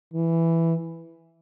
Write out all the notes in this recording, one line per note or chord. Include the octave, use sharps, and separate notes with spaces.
E3